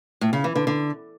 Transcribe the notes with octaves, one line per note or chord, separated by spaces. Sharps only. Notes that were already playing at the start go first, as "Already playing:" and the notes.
A2
C#3
E3
D3
D3